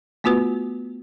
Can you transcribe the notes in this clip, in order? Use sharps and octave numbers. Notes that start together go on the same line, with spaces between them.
A3 B3 F4 F#4 B4